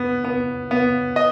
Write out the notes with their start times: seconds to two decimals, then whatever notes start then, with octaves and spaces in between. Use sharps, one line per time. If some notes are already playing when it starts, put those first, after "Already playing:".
Already playing: B3
0.24 B3
0.71 B3
1.16 D#5